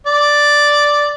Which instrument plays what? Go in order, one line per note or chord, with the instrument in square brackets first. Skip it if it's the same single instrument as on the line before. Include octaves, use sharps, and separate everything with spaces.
[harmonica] D5